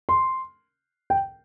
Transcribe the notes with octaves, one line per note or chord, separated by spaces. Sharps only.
C6
G5